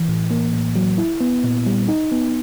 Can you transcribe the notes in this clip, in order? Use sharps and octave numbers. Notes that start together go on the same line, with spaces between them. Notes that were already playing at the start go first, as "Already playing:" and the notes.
Already playing: E3
A2
A#3
A2
F#3
E4
B3
A#2
G3
D#4
B3